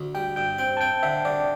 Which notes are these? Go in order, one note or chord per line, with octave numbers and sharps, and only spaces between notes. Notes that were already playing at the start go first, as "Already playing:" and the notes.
Already playing: D2
G3 G5
G2 G5
C4 G5
A5
C4 G5
D3 E5
D3 D5